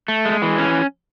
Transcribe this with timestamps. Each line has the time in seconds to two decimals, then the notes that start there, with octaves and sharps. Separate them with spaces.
0.08 A3
0.25 G#3
0.42 E3
0.58 C#4